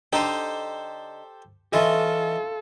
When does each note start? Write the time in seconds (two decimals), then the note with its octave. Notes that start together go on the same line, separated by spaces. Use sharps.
0.13 D3 D4 D#4 G4 A4 C5
1.73 E3 C#4 E4 F4 A4 D#5